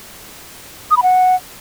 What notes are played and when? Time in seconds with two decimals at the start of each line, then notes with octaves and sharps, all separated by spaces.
0.91 D#6
0.97 B5
1.03 F#5